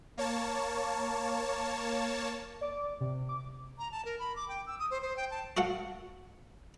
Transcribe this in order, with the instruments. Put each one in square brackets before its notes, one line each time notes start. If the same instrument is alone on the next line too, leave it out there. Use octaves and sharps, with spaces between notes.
[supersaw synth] A#3 C#5 A5
[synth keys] D5 D6
C3
D6
[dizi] A#5
A5
A#4
B5
D6
G5
E6
D#6
C5
C5
G5
A5
[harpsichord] F#4 A4 F5 F#5